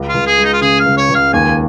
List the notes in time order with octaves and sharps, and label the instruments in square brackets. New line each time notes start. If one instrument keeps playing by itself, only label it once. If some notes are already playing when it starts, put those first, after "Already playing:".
Already playing: [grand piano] C#2
[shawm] F4
[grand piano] C#2
[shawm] G#4
[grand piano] G#3
[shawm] D#4
F4
[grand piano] C#3 [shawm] G#4
[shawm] F5
[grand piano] C#2
[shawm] C#5
[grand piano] C#2
[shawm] F5
[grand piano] D#2 [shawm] G#5